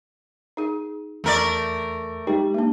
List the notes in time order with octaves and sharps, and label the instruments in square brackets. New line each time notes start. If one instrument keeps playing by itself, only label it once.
[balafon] D#4 G#4
[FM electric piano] E2 [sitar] A3 A#4 D5
[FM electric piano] G#3 G4 [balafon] D#4
[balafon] A#3 D4